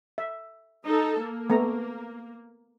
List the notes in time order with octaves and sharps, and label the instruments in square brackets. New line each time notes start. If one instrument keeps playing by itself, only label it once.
[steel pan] E5
[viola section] D#4 A4
A#3
[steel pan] A3 B3 A#5